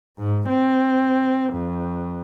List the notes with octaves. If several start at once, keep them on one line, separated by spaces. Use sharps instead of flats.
G#2
C4
F2